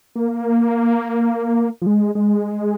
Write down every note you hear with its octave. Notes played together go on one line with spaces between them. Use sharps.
A#3
F3
G#3
G#3